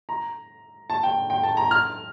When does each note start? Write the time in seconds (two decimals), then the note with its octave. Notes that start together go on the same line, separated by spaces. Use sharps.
0.09 A#5
0.90 A5
1.03 G5
1.30 G5
1.43 A5
1.57 A#5
1.71 F6